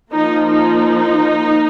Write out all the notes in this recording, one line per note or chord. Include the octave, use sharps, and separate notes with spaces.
F3 A#3 D#4
D#4